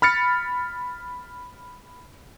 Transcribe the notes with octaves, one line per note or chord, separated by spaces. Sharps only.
B5 F6 A6 C#7